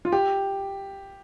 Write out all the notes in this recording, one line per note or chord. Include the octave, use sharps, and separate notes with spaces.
F4
G4